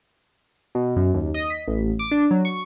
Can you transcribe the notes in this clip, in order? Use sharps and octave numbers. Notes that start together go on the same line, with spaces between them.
B2
F#2
D#2
D#5
B6
A1
D6
D4
F#3
C#6